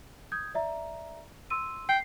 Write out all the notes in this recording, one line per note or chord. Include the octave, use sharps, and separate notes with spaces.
D#6 G6 G#6
D5 E5 A#5
C6 E6 D#7
G5 C7